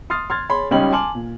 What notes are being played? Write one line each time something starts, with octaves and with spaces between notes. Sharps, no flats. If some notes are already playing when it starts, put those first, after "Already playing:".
C6 D#6 F6 A6 C7
C6 F6 G#6 A6
G#4 C#5 B5 C6
C#2 G3 C#4 D#4 G4 F#7
G#5 A5 C6 D6 F6 F#7
A#2